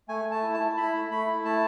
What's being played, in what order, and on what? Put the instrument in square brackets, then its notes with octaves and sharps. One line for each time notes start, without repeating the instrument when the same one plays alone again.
[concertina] A3 G#5
A3
A5
E4
A5
E4
E4 B5
A3
A3 B5
E4
A3 A5